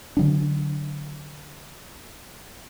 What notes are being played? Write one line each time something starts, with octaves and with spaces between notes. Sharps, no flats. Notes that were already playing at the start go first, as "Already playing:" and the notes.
D3 F#3 D4